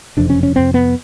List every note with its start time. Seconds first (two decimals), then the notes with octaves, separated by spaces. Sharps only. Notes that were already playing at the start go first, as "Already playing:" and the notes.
0.17 F#1 F2 C3 D4
0.30 C#4
0.43 C#4
0.55 F#1 F2 C3 C4
0.74 B3